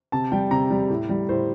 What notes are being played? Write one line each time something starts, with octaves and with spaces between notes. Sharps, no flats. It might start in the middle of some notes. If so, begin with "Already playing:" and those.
C3 A5
G3 G5
C3 A#5
G3
A2
G3
A2 C5